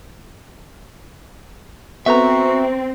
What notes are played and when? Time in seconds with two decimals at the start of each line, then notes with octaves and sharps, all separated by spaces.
2.06 B3 C4 F#4 A4 B4 E5 A#5